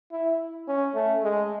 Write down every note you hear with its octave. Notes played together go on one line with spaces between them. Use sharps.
E4
C#4
A3
G#3